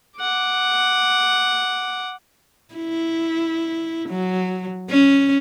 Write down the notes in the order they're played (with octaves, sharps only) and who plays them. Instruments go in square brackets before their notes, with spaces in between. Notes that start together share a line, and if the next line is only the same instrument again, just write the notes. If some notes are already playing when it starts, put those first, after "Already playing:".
[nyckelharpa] F#5 D6
[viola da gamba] E4
F#3
C#4